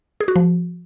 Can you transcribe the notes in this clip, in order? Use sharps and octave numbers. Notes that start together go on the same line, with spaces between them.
G#4
F#4
F3